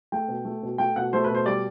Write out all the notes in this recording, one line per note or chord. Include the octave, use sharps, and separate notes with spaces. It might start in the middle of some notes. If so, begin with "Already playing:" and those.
A3 G5
B2
A3
B2
A3 G5
B2 F#5
A3 C5
B4
B2
C5
G3 D5